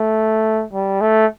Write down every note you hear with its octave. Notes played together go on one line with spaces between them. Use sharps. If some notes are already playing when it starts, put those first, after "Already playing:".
Already playing: A3
G3
A3